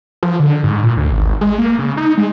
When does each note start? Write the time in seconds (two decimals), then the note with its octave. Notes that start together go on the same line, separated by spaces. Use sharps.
0.23 F3
0.40 D3
0.64 G#2
0.83 A#2
0.97 D2
1.11 G#1
1.41 G#3
1.58 A#3
1.79 C#3
1.97 D#4
2.18 G#3